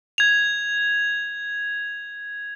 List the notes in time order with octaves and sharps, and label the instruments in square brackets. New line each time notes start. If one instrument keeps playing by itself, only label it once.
[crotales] G#6 F7